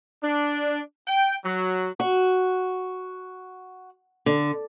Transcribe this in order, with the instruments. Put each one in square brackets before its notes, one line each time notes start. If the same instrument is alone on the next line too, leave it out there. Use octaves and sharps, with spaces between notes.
[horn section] D4
G5
F#3
[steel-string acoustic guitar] F#4
D3